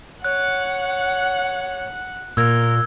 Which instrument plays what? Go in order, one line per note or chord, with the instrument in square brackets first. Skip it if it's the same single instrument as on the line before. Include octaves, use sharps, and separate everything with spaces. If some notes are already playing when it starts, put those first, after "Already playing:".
[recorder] C#5 [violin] F#5 [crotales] F#6
[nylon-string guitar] A#2 [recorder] A#4 [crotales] E6 G#6